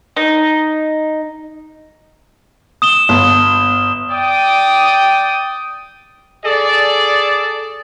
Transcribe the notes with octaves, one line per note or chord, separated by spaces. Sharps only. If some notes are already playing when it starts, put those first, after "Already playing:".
D#4
D#6 E7 G7
G1
D5 G5 D#6
G#4 A4 D5